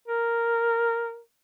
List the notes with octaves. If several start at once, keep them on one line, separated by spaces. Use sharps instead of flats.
A#4